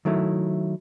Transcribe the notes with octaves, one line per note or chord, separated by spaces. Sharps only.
D#3 F#3 A3 E4